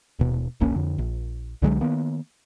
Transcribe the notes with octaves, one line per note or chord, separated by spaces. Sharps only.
D#1 B2
E1 A#1 A#3 C#4
F2 D3
A#1
C2 D3 F#3 G#3
D#3 A#3 B3